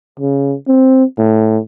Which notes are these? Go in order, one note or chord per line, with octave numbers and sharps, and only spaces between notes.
C#3
C4
A2